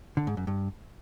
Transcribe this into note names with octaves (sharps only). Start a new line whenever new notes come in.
D3
G#2
F#2
G2